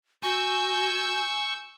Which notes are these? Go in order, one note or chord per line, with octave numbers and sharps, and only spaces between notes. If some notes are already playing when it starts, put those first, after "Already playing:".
F#4 G#5 C#6 E6 G6